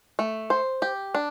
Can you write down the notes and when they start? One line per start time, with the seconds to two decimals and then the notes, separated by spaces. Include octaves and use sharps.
0.19 A3
0.50 C5
0.82 G4
1.15 D4